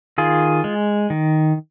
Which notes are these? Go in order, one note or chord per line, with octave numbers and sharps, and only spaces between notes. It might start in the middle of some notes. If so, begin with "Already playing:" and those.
D#3 F4 G#4
G#3
D#3